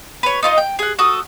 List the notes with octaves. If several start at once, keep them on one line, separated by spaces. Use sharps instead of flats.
B4 C#5
D#4 F4 C#5 D#5
G5
G#4 F#5
F#4 A4 D#6